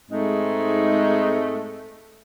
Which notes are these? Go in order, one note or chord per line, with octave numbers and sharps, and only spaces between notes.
G#2 G#3 A3 C4 D#4